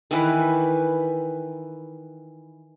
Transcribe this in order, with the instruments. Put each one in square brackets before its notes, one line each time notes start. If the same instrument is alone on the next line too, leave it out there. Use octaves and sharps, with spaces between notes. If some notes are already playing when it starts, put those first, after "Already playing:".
[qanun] D#3 E3 B4